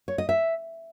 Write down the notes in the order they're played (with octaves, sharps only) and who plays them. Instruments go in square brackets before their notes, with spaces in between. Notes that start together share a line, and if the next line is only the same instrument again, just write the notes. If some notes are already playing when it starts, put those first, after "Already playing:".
[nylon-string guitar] C#5
D#5
E5